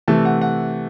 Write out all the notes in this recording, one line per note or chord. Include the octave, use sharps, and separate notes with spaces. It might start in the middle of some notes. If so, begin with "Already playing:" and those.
C3 E3 A3 A5
F#5
F#5